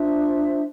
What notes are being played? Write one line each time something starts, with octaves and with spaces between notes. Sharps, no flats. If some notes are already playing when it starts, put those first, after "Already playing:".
Already playing: D4 F4 C5 E5